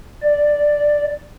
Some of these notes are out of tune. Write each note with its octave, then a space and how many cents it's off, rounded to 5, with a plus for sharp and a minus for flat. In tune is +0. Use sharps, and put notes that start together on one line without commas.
D5 +5